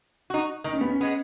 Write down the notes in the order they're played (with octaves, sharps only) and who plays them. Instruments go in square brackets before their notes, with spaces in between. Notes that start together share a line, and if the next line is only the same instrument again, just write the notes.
[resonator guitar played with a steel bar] D#4 F#4
[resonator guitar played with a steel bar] D#3 [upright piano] D#4
[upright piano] C#4
B3
C#4
[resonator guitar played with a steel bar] G#3 B3